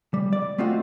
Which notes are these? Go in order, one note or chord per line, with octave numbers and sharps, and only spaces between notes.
G3
D5
A3 C4 D#4 F4 F#4